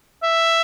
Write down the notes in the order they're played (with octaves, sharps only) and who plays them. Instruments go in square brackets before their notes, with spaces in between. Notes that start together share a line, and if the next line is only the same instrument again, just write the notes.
[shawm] E5